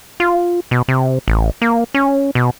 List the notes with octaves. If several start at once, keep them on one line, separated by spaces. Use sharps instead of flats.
F4
B2
C3
A1
A#3
C#4
B2